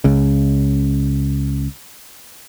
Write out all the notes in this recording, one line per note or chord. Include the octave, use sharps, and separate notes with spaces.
C#2 C#3